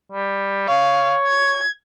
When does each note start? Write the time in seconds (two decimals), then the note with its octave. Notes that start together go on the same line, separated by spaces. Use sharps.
0.12 G3
0.68 C#5 F5
1.28 G#6